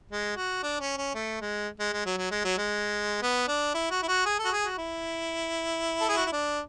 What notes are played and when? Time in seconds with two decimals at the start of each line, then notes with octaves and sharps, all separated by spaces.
0.11 G#3
0.36 F#4
0.63 D4
0.81 C#4
0.97 C#4
1.15 A3
1.41 G#3
1.80 G#3
1.93 G#3
2.06 F#3
2.18 F#3
2.31 G#3
2.45 F#3
2.58 G#3
3.22 B3
3.48 D4
3.75 E4
3.91 F#4
4.03 E4
4.08 F#4
4.26 G#4
4.39 A4
4.45 F#4
4.52 G#4
4.64 F#4
4.78 E4
6.01 A4
6.09 G#4
6.17 F#4
6.25 E4
6.33 D4